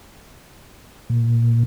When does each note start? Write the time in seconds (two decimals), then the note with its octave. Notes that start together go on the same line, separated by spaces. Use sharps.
1.10 A#2